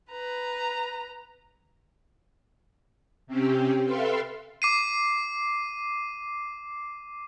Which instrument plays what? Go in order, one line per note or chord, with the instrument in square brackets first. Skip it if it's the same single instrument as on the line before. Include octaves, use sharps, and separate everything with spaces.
[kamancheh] B4 A#5
[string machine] C3 C4 C#4 G4
A4 B4 E5 F5 G5 C6
[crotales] D6 C7 D#7